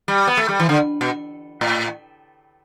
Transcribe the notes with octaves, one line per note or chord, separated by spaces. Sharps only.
G3
B3
A3
G3
E3
D3
B2
A2